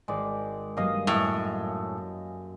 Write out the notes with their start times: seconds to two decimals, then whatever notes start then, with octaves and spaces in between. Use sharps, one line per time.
0.08 G#1 G#3 D5
0.77 G2 F#3 A#3 D#5 F5
1.07 F#2 A2